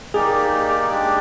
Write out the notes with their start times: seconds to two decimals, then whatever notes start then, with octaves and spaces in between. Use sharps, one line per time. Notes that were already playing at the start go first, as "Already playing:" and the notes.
0.14 A#3 D#4 G4 G#4 D5
0.90 G#3 D4 G4 D5